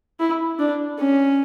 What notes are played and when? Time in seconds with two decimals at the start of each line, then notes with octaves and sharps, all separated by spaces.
0.20 E4
0.59 D4
0.99 C#4